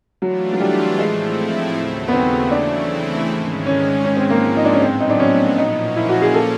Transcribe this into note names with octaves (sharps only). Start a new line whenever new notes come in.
E3 F#3 A3 D4 F4
F#3
G3
A2 F3 G#3 A3 C4 E4
D#2 C#3 F#3 A3
B3
C4
C#3 E3 A3 C4 D4 E4
G#2 D#3 G#3 C#4
C#4
G#2 F3 G#3 C#4
C4
A#3
D#4
D4
C#4
A2 F#3 B3 C4
D#4
D4
C#4
A#2 F3 A#3 C#4 D#4
E4
F#4
G#4
A4